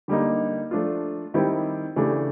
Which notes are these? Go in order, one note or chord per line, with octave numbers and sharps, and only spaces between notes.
D3 G3 A#3 D#4
F3 A3 D4 F4
D#3 G3 C4 E4 G4
C#3 E3 A3 D4 G4